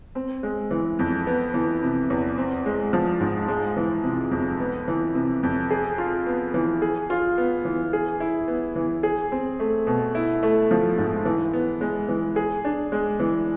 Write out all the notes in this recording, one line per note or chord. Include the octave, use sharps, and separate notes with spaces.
C4
G#3
E3
F2
B3
E3
C3
E2
C4
G#3
F3
G#2
G#3
E3
C3
F2
B3
E3
C3
F2
G#4
F4
B3
E3
G#4
F4
B3
E3
G#4
E4
B3
E3
G#4
C4
A3
B2
E4
A3
F3
G#2
E3
B3
G#3
E3
G#4
D4
G#3
E3